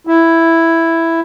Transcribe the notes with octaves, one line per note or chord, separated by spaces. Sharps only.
E4